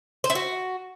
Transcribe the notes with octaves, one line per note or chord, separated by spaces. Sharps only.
C5
E4
F#4